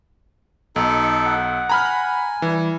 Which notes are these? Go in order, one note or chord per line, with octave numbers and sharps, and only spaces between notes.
B1 D#4 A4
F#5
G#5 A#5 B5 F6
E3 G3